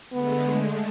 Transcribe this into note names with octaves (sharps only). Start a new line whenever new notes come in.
D3 G#3 A3 B3